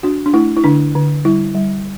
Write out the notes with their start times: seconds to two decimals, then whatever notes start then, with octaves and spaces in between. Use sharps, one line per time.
0.03 D4 F#4
0.26 D4
0.33 A3 E4
0.57 E4
0.64 D3 D4
0.95 D3
1.25 G3 E4
1.55 G3